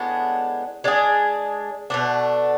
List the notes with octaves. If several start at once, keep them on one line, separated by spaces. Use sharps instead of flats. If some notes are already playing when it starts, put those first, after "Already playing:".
Already playing: A2 G#3 B3 D4
G#3 D4 G#4
B2 A3 D4